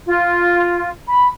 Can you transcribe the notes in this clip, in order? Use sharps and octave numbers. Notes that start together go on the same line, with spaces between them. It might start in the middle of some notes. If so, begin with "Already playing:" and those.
F4
B5